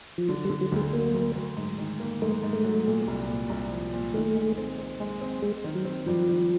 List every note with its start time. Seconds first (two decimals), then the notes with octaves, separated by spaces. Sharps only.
0.18 F3
0.29 D3 F#3
0.45 G3
0.50 D3
0.61 F#3
0.72 D2 G#3
0.93 F#3 A#3
1.14 D2
1.36 D2
1.57 G#2
1.78 D#3
2.00 A#3
2.22 G#2 A3
2.43 G#2
2.53 A3
2.65 F#3
2.86 A#2
3.08 C2
3.28 A#2
3.50 C2
3.72 F3
3.93 A#2
4.14 D#3 A3
4.35 G#3
4.58 C4
4.79 C4
5.00 G#3
5.21 C4
5.42 G#3 C4
5.64 D#3
5.75 F#3
5.85 C4
6.06 G2 F3
6.29 D#3